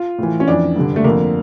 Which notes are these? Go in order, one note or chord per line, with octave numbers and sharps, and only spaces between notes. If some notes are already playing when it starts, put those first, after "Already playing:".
Already playing: F4
A2 E3
C#4
F2 E3 D4
G2 D3
A3
F2 D3 A#3